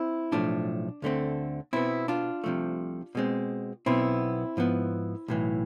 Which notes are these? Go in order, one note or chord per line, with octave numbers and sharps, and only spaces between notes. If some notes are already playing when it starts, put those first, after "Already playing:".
Already playing: C4 E4
B1 A2 F3 A3 D4
D2 D3 A3 C4
B2 B3 C4 E4
D4 F4
C2 C3 F3 A3
B2 G#3 C4
B1 B2 B3 C4 E4
G#2 F3 B3
B1 A2 E3